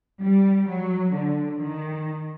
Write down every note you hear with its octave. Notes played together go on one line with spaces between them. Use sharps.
G3
F#3
D3
D#3